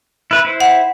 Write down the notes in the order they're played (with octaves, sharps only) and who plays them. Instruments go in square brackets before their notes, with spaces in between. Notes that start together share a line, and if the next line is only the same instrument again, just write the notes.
[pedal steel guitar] E4 B4
E4 C5
[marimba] F#5